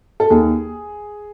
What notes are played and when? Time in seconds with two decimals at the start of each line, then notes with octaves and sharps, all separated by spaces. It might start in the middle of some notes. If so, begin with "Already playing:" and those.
0.20 A4
0.30 D#2 G#4